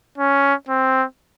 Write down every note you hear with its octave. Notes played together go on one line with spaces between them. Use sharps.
C#4
C4